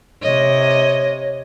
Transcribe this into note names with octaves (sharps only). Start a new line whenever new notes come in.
C3 C#5 D#5